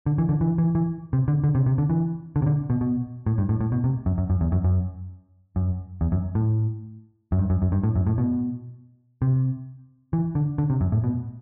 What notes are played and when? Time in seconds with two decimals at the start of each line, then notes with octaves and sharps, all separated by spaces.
0.06 D3
0.18 E3
0.29 D3
0.41 E3
0.58 E3
0.75 E3
1.13 C3
1.28 D3
1.44 D3
1.55 C3
1.66 C3
1.78 D3
1.90 E3
2.36 D3
2.42 C3
2.46 D3
2.70 B2
2.81 B2
3.26 A2
3.38 G2
3.49 A2
3.61 A2
3.72 B2
3.84 C3
4.06 F#2
4.18 F#2
4.30 F#2
4.41 E2
4.52 F#2
4.64 F#2
5.56 F#2
6.01 E2
6.12 F#2
6.35 A2
7.32 F#2
7.39 G2
7.50 F#2
7.62 F#2
7.72 G2
7.83 A2
7.96 F#2
8.07 A2
8.18 B2
9.22 C3
10.13 E3
10.35 D3
10.58 D3
10.70 C3
10.81 F#2
10.92 A2
11.04 B2